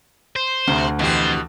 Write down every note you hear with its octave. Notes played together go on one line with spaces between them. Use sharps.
C5
D2 C3
F2 B2 E3 G4 C5